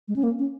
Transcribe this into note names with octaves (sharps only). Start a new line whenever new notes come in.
G#3
C#4
A#3
C#4